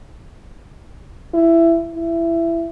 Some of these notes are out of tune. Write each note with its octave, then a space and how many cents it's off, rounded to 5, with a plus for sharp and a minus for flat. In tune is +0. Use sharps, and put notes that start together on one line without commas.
E4 +15
E4 +20